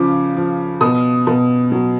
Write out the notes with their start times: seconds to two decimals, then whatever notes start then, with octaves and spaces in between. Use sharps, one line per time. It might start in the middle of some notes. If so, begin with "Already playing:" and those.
Already playing: C#3 F3 D6
0.37 F3
0.81 B2 D#6
1.27 B2
1.72 F#3